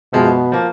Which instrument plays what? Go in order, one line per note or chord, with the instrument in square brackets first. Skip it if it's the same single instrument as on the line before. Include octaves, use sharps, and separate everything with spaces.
[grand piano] F#2 F3 G#3 [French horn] B2
[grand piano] F3 A#3